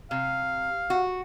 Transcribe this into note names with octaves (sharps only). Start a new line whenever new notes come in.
C3 F5
F#4